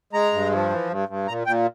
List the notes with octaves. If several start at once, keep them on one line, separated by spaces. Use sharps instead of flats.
G#3 A#5
G2
F3
E3
G2
G2
A#2 A#5
A#2 G5